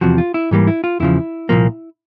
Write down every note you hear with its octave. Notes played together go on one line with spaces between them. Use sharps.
E2 C3 F3 F#4
F4
E4
G#2 E3 G3 A#3
E4
F4
E2 C#3 F3 E4
C2 A#2 F3 A#3